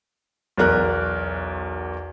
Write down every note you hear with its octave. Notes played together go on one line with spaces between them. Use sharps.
B1 E2 A#4 F#6